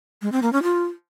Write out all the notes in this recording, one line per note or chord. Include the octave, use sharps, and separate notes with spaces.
G#3
C4
A#3
C#4
F4